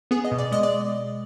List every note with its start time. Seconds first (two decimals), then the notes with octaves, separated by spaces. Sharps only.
0.11 B3 G#4
0.25 D#5
0.32 B2
0.38 D5
0.52 G#3 D#5
0.63 D5